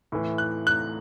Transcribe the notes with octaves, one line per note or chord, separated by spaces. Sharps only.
A2 E3
F#6
F#6